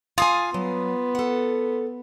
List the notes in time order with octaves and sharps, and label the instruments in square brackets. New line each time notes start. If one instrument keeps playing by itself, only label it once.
[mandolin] F4 D#6 [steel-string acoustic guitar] F5 G5 G#5
[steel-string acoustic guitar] F#3 [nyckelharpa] B3
[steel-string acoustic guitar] A4 F#5